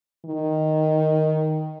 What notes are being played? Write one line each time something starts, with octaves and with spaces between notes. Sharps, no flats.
D#3